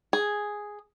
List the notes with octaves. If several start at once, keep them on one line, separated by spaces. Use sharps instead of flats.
G#4